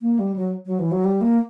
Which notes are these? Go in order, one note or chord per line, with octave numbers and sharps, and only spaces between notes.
A#3
G3
F#3
F#3
E3
F#3
G3
A#3